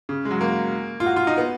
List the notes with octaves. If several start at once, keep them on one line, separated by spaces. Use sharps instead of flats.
C#3
G#3
F#3
A#3
F4
F#4
F4
D#4
B3